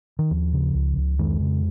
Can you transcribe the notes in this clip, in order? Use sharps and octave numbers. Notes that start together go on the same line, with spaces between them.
D#3
D#2 F3
C#3
C#2
C#2
F2 D#3 G#3
C#3